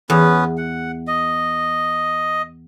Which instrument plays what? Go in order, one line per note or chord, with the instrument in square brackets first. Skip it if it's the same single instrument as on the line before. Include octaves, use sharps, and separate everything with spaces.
[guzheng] E2 [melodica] B3 C#4 B4
[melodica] F#5
D#5